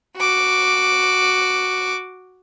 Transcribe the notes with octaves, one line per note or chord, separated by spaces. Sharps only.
F#4 D6